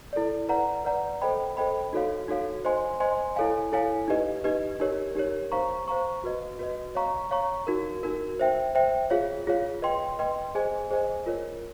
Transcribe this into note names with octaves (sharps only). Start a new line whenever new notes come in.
E4 A4 D5
B4 D5 F#5 A#5
B4 D5 F#5 A#5
A4 C5 D#5 G5 B5
A4 C5 D#5 G5 B5
D#4 F#4 A4 C#5 F5
D#4 F#4 A4 C#5 F5
C5 D#5 G#5 C6
C5 D#5 G#5 C6
E4 A4 C#5 F5 G#5
E4 A4 C#5 F5 G#5
D#4 G4 B4 D#5
D#4 G4 B4 D#5
D#4 G4 A#4 C#5
D#4 G4 A#4 C#5
C5 F5 A#5 C#6
C5 F5 A#5 C#6
F#4 B4 D#5
F#4 B4 D#5
C#5 F5 A#5 C#6
C#5 F5 A#5 C#6
D#4 F#4 A#4
D#4 F#4 A#4
C5 E5 G5
C5 E5 G5
F4 G#4 C#5 F5
F4 G#4 C#5 F5
B4 D#5 G5 C6
B4 D#5 G5 C6
G#4 C5 D#5 G#5
G#4 C5 D#5 G#5
F4 A#4 C#5